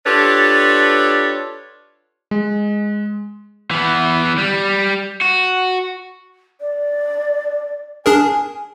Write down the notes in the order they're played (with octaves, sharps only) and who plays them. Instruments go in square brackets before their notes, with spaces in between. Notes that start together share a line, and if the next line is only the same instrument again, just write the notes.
[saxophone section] D4 F4 G4 A4 B4 C#5
[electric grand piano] G#3
[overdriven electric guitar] E3 B3
G3
F#4
[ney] D5
[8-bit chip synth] D4 G#4 A#4 [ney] G#5